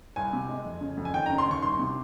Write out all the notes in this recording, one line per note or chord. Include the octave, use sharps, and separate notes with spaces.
C2 G#5
C3
G#3
F2
C#3
F2
G#5
D#2 G5
A#5
C#3
C6
D#2
C#6
C2 C6
C3